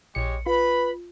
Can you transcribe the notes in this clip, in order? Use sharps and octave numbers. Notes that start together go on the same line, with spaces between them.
A#1 G#3 G4 C#5 C#7
F4 B4 B5